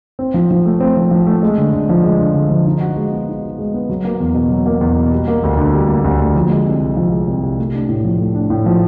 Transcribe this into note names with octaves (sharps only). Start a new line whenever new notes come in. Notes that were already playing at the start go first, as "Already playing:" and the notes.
C4
F3
F3
A3
C4
F3
F3
A3
G#3
D3
D3
F3
G#3
D3
D3
F3
D#4
F#4
G#3
B3
D#4
F#4
G#3
B3
F#3
A#3
E2
B2
F#3
A#3
E2
B2
G3
A#3
D2
D3
G3
A#3
D2
D3
F3
G#3
C2
C3
F3
G#3
C2
C3
A3
D4
A2
F3
A3
D4
A2
F3